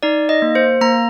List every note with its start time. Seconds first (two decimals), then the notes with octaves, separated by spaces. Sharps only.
0.03 D#4 D5
0.29 D#5
0.42 A#3
0.55 C5
0.81 A#3 A#5